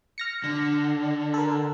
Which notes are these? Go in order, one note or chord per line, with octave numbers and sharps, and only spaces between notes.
F6 A#6 C#7
D3
A4 A#4